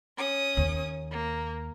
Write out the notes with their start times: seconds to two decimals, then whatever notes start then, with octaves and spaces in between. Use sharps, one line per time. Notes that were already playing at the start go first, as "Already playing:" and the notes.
0.17 C#4 D#6
0.57 D#2
1.11 A#3